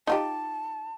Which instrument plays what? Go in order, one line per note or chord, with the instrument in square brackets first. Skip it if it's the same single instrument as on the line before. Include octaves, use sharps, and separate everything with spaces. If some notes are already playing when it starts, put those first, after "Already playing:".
[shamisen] D#4 F4 G4 [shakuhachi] A5